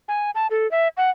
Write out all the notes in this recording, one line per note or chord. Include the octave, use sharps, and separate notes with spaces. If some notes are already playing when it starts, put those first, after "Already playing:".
G#5
A5
A4
E5
F#5